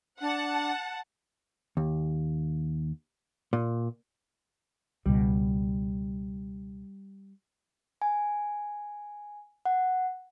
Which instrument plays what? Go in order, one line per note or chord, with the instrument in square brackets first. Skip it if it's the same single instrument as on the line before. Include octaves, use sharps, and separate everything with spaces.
[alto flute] D4 [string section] F#5 A5
[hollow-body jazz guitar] D#2
A#2
[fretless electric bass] C#2 B2 [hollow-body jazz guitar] G3
[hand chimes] G#5
F#5